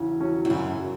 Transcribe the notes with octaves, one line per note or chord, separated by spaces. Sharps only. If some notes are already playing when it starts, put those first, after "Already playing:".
Already playing: E2 C#3 F#3 C#4
F#3 C#4 F#4
E2
F#2 C#3
F#3